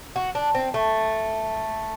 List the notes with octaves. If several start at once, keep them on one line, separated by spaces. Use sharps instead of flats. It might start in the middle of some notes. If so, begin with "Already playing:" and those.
F#4
D4
C4
A3